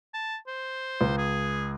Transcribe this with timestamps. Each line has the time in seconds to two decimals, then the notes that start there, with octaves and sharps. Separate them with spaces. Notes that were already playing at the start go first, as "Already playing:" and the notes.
0.14 A5
0.47 C5
1.01 C#2
1.17 G#4